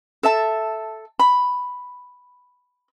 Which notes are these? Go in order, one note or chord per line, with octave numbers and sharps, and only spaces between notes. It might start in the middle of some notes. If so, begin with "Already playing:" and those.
A4 E5 A5
B5